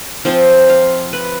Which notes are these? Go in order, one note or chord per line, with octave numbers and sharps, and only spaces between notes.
F3 C4 F4
F5
B4